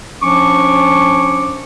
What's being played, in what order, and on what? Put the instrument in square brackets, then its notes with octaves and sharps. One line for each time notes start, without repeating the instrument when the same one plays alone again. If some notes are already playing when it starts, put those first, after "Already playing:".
[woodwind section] F3 C#4 D4 C#6 D6